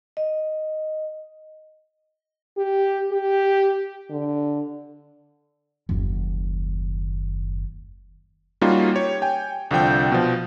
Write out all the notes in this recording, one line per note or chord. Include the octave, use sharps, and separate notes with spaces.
D#5
G4
G4
D3
F#1 D#2
G3 A#3 C#4 D#4 F4 F#4
G4 C#5
G5 G#5
C2 D3 F3 G5 G6
B2 F3